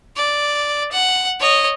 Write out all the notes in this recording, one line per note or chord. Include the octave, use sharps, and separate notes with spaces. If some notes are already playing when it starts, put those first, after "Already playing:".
D5
F#5
C#5 D#5